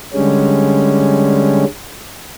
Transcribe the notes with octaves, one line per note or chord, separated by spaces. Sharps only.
D3 G3 G#3 C#4